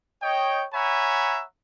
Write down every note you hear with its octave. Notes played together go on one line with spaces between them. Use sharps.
C#5 D#5 G5
C#5 E5 F#5 G#5 A#5 B5